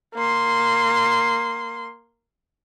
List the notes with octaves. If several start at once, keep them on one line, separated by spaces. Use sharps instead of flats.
A#3 C6